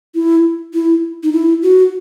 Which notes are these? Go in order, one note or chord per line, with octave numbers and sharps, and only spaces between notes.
E4
E4
D#4
E4
F#4